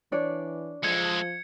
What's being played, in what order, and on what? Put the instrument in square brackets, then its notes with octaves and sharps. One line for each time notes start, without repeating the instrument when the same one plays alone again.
[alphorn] E3 [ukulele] D4 C#5 D5
[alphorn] F3 [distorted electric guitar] G#3 A4 [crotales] G#6 C#7